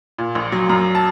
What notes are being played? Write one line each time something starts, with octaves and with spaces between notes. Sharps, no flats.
A#2
A#1
F#3
F#2 A#5
A5